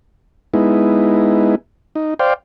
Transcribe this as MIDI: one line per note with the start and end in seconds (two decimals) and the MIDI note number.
0.54 1.55 56
0.54 1.55 59
0.54 1.55 63
0.54 1.55 64
1.95 2.14 63
2.19 2.34 72
2.19 2.34 74
2.19 2.34 77
2.19 2.34 79